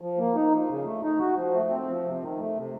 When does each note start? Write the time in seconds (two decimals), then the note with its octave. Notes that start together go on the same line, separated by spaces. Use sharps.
0.01 F3
0.18 A#3
0.35 D#4
0.52 F3
0.69 C#3
0.85 A3
1.03 D#4
1.19 F#4
1.36 F3
1.53 A3
1.70 C4
1.87 F3
2.04 C3
2.20 D#3
2.38 A3
2.55 C3